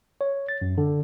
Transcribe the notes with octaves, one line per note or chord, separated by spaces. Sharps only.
C#5
A6
F#2
D3